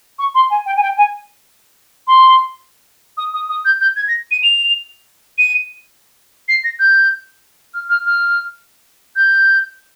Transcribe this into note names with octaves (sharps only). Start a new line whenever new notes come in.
C#6
C6
G#5
G5
G#5
G5
G#5
C6
D#6
D#6
D#6
G6
G6
G#6
A#6
D#7
F7
D#7
C7
A#6
G6
F6
F6
F6
G6